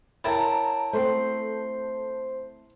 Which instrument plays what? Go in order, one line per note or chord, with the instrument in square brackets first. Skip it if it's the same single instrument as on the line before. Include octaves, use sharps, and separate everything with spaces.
[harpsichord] E4 A#4 [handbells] C#5 G5 A5 [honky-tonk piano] A#5 A6
[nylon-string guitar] A3 C4 [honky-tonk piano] A4 [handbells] C5 C6 C7